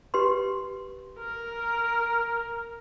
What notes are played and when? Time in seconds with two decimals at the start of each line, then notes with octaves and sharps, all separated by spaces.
0.14 G4 B4 C6
1.19 A#4